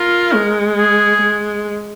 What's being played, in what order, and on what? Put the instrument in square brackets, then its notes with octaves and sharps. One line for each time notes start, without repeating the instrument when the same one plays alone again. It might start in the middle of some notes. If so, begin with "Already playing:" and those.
Already playing: [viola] F4 [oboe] A#4
[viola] G#3
[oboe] G#4
[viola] G#3